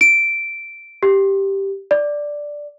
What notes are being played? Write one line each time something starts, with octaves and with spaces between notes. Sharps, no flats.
D7
G4
D5